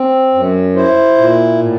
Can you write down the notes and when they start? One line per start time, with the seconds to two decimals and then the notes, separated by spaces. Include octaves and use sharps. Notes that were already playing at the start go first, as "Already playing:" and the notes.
Already playing: C4
0.34 F#2
0.75 E4 C5
1.18 A#2
1.60 A2